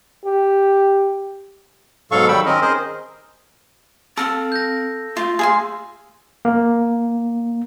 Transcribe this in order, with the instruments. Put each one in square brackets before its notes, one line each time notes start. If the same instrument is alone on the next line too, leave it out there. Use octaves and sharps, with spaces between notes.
[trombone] G4
[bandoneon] G#2 B2 F#3 A4 F5 C#6
D#3 F#3 G3 G5 B5 E6
D#3 C4 C#4 A#4 D#5
G#4 A#4 C5 D#5
[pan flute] C4 [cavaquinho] A4 F5 [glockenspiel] E6
[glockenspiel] G6 A#6
[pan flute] A3 [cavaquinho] F4
[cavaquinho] G#4 F5 C6
[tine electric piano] A#3